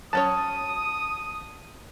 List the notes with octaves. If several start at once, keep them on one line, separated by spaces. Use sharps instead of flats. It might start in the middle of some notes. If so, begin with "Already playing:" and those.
F#3 C#4 C#5 A5 D#6